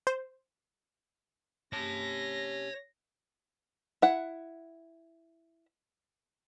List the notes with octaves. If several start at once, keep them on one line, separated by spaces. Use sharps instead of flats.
C5
C3 C#4 C#5 A5 A#6
E4 F#5